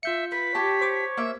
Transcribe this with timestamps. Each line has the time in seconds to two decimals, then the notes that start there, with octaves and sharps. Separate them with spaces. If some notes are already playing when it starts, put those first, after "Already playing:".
0.03 F4 E5 G6 C#7
0.32 B4 B6
0.55 G4 C#5 A5
0.81 C5 C#6 D6
1.17 A#3 E5